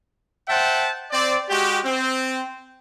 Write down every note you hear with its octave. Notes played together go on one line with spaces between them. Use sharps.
C5 E5 F#5 G5 A5
C4 D5
G#3 F#4 G4
C4